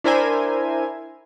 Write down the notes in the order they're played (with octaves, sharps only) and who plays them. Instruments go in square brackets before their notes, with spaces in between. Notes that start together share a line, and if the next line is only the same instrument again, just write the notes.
[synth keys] D4 E4 A#4 C5 E5 G#5